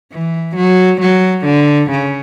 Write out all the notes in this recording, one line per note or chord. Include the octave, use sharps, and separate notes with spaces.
E3
F#3
F#3
D3
C#3